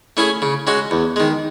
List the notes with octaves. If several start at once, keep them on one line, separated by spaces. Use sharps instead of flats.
A3 C#4 E4 G#4
C#3
G#3 C#4 F#4
E2
D#3 G#3